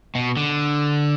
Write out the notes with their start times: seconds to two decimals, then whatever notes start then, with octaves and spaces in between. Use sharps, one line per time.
0.15 B2
0.37 D3